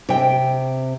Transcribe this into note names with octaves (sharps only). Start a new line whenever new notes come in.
C3 G5